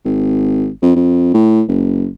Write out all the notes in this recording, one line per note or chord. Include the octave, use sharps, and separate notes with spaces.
G#1
F2
F2
A2
F#1